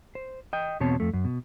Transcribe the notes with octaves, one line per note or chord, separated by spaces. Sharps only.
C5
D#5 G5
E2 B2 C4 C#5 A5
F2 A3
F#2
B2